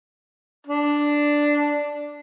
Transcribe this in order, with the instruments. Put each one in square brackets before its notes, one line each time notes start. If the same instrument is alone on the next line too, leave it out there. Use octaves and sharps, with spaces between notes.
[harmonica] D4